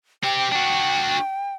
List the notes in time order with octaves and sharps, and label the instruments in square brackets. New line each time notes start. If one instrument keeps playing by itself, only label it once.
[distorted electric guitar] C4 G4 [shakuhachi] G5
[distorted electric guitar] D4 F#4